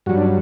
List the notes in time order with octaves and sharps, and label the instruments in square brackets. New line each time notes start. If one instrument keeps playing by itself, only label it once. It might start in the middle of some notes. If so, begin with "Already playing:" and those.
[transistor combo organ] G2 F#3 F#4
D4